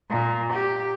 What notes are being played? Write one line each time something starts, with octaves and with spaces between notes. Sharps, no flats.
A#2
G4